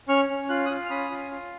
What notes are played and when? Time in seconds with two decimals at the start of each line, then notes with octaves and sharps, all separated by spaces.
0.08 C#4 C#6 F6
0.29 C#4
0.49 F4 F#6
0.65 D#6 F#6
0.70 F4
0.86 F6
0.90 C#4 B5 D#6
1.10 F4
1.31 F4